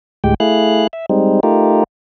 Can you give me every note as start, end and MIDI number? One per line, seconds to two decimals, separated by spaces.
0.24 0.34 38
0.24 0.34 45
0.24 0.34 56
0.24 0.34 67
0.24 0.34 79
0.40 0.87 57
0.40 0.87 64
0.40 0.87 68
0.40 0.87 77
0.40 0.87 90
0.93 1.06 76
1.09 1.40 55
1.09 1.40 56
1.09 1.40 60
1.09 1.40 63
1.43 1.84 57
1.43 1.84 63
1.43 1.84 65
1.43 1.84 67
1.43 1.84 70